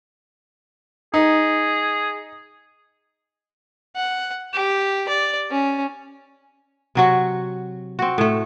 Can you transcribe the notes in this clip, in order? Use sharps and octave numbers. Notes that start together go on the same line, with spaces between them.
D#4 G#4
F#5
G4
D5
C#4
C3 F#3 F#4
C4 F#4
A2 A3